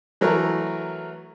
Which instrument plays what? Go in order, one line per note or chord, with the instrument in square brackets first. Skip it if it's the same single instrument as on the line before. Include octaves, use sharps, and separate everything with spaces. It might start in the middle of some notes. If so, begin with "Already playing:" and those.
[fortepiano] E3 F#3 A3 A#4